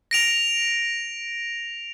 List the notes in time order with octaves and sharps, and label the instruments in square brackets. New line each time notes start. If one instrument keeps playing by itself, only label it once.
[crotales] A#6 D7 F7